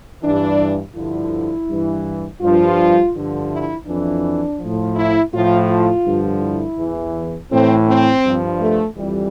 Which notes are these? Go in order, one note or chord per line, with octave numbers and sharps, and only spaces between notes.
G2 E3 D4
G2 D3 F3 E4
G2 E3
G2 F3 F4
G2 D3 F3
E4
F2 E3 D4
A2 F3
E4
A2 F3 F4
F4
G2 D3 F3
E4
E2 E3
A2 E3 C4
C4
G2 F3
A3
F2 E3 G3